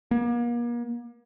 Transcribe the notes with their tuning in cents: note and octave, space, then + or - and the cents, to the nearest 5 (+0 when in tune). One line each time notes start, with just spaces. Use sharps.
A#3 +40